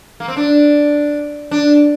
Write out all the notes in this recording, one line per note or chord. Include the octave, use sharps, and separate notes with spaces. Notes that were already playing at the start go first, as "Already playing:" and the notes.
A#3
C4
D4
D4